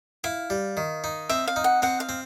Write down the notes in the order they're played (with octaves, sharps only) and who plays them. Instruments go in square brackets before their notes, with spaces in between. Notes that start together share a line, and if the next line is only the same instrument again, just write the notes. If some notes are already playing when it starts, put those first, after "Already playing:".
[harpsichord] E4 [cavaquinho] F5
[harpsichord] G3
D#3
D#4
[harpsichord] C4 [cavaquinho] E5
[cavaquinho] F5
[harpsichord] D#4
[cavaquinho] F#5
[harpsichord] C4 [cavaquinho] F#5
[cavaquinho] F5
[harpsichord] C4